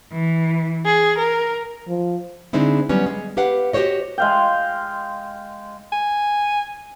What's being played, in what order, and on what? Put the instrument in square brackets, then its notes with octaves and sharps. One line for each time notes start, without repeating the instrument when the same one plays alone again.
[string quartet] E3
G#4
A#4
[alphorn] F3
[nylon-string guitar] D3 G#3 C4 D#4 E4
F#3 G3 B3 C#4
G#3
G4 B4 F5 F#5
F#4 G4 A#4 C5 C#5 D#5
[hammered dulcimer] G#3 F5 G5
[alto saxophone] G#5